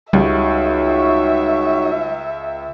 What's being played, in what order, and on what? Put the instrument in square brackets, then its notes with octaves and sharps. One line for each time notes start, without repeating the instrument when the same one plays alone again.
[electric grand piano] C#2 [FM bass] G3 [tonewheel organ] D#4 F#4 C#5 [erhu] E5